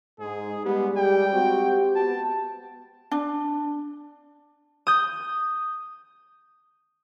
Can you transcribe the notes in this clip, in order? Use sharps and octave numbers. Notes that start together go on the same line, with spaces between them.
G#2 G#4
G3 G#3 B3 G4
G5
G#3 C4 F#4
B3 A5
D4
D#6 G6